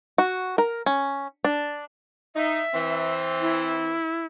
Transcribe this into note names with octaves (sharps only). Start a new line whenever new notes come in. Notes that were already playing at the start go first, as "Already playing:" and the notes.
F#4
A#4
C#4
D4
D#4 E5
E3 C4
E4